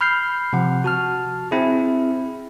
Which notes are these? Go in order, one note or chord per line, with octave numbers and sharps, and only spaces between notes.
B5 F6 G6 C7
C3 F3 F#5
F#4 A5 F6
C4 E4 G#4